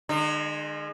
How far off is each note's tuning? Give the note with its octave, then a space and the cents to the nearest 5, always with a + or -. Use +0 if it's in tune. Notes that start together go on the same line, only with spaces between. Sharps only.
D#3 -45 G#3 +0 D#4 -45